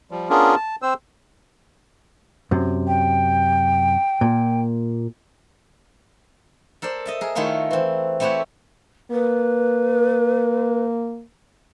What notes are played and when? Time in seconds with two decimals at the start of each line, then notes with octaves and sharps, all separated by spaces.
0.11 F3 G3
0.30 B3 C#4 D4 F4 G#4 A#4
0.56 A5
0.82 C4 C5 E6
2.51 F#2 C3
2.88 G5
4.21 A#2
6.82 A4 A#4 C5 D5
7.06 D#5 E5 A5
7.21 G#4 A#4
7.35 D#3 A3 E4 F4 A#4 C#5
7.71 E3 C4
8.20 A3 C4 E4 G4 C#5 F#5
9.11 A#3 B4